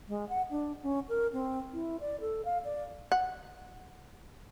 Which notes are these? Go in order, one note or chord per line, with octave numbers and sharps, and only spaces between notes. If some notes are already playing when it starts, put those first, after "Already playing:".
G#3
F#5
D4
C#4
A#4
C4
E4
D5
A4
F5
D5
F#5